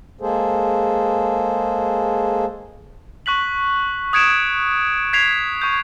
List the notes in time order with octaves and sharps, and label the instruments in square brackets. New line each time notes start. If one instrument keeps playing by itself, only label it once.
[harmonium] G#3 A#3 G#4 A4 C5
[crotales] C#6 F#6 B6 F#7
D#6 F#6 G#6 C#7 D7 E7
G#6 B6 C7 F7
C#6 G6